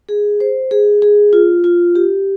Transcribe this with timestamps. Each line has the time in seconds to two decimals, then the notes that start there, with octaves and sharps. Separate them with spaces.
0.09 G#4
0.40 C5
0.71 G#4
1.02 G#4
1.33 F4
1.64 F4
1.95 G4